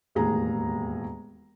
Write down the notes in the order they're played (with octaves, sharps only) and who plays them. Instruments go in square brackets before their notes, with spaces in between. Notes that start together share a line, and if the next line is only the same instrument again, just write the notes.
[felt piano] E1 D#2 A2 G#4 A#5